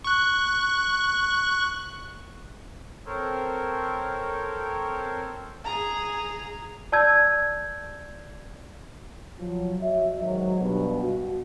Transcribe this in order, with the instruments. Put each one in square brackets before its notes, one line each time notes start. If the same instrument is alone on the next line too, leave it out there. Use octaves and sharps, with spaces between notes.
[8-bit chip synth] C#6 F#6
[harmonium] C4 A4 A#4 C5 C#5
[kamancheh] G#4 A#5
[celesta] D5 A5 E6 G6 G#6
[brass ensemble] F3 F#3
F#4 C#5 D#5 E5
G#2 D#3 F#3
G2 B2
F#4